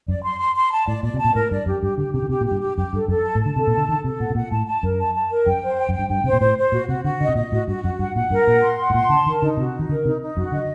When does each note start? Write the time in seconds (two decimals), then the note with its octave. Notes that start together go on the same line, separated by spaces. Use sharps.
0.08 F#2 D5
0.24 C6
0.40 C6
0.56 C6
0.72 A5
0.87 A2 D5
1.03 A#2 D5
1.14 C3
1.19 A5
1.24 A#2
1.35 A2 A#4
1.50 G2 D5
1.66 F#2 G4
1.82 G2 G4
1.98 D3 G4
2.14 C3 G4
2.22 D3
2.29 C3 G4
2.41 A#2
2.46 G4
2.51 G2
2.61 G4
2.77 F#2 G4
2.93 G2 A4
3.08 F#2 A4
3.25 A5
3.35 A2
3.40 A5
3.46 D3
3.56 C3 A4
3.67 A#2
3.72 D3 A5
3.88 D#3 A4
4.04 C3 A4
4.20 A#2 F#5
4.30 C3
4.35 A#2 F#5
4.51 A2 A5
4.67 A5
4.83 F#2 A#4
4.99 A5
5.14 A5
5.31 A#4
5.46 F#2 G5
5.62 C5
5.78 G5
5.89 F#2
5.94 G2 G5
6.09 G2 G5
6.24 C3 C5
6.33 A#2
6.41 A2 C5
6.57 C5
6.72 A#2 F#4
6.89 C3 F#4
7.04 D3 F#4
7.21 D3 D#5
7.29 C3
7.35 A#2 D#5
7.52 A2 F#4
7.67 G2 F#4
7.83 F#2 F#4
7.99 G2 F#5
8.15 A#2 F#5
8.30 G2 A#4
8.47 A#2 F#5
8.63 C6
8.78 F#5
8.90 A2
8.94 A#2 C6
9.09 D3 A5
9.26 D#3 A#4
9.41 D3 D#4
9.57 C3 F#4
9.73 D#4
9.79 D#3
9.89 D3 A#4
10.05 C3 D#4
10.21 D#4
10.37 F#2 F#4
10.52 D3 D#5